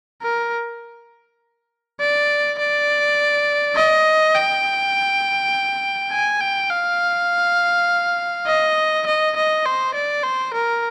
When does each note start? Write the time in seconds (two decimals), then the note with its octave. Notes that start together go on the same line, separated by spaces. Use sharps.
0.22 A#4
2.00 D5
2.58 D5
3.76 D#5
4.35 G5
6.12 G#5
6.41 G5
6.71 F5
8.47 D#5
9.06 D#5
9.36 D#5
9.66 C5
9.94 D5
10.23 C5
10.54 A#4